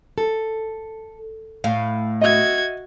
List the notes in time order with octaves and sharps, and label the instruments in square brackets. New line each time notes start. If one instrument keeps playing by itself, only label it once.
[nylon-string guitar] A4
[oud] A2 [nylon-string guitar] F5
[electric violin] F#4 G#6 [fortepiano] D#5 E5